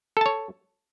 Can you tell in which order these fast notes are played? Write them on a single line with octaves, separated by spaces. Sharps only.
A4 A5 C#5